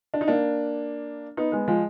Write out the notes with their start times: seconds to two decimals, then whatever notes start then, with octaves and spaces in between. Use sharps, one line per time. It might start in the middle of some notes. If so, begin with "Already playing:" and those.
0.14 D4
0.21 D#4
0.28 A#3 D4
1.37 B3 D#4
1.52 G#3 B3
1.68 F3 G#3